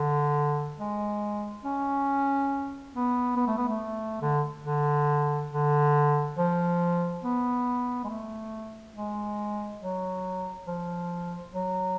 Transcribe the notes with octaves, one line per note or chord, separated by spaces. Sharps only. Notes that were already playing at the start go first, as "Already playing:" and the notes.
Already playing: D3
G#3
C#4
B3
B3
A3
B3
A3
D3
D3
D3
F3
B3
G#3
A3
G#3
F#3
F3
F#3